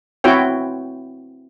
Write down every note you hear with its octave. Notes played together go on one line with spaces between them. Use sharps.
C4 E4 F#4 C#5 G5